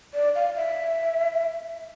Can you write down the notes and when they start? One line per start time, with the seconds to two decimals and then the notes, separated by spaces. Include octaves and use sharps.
0.14 D5
0.35 F5
0.57 E5